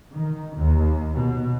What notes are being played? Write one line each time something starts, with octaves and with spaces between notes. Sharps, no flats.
D#3
D#2
B2